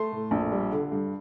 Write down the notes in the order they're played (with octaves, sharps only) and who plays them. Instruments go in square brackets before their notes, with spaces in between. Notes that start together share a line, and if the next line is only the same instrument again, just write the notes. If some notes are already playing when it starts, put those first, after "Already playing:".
Already playing: [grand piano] A3 C6
A2
A#1
G3
D3
G2